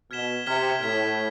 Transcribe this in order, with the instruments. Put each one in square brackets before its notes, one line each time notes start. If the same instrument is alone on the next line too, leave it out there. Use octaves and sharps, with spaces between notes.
[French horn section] B2 [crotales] F6 G#6 B6 E7 G7
[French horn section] C3 [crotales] F6 G#6 B6 E7 G7
[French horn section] A2 [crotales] F6 G#6 B6 E7 G7